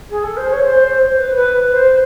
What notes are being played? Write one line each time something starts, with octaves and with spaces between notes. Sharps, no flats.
G#4
A4
C5
C#5
C5
C5
B4
B4
C5